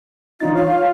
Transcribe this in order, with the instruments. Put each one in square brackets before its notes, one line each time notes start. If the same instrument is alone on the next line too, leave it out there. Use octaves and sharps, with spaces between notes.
[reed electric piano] E3 D4 A6 [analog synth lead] D#4 [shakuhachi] F4
[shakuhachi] F4 [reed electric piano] C#5 [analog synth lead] F5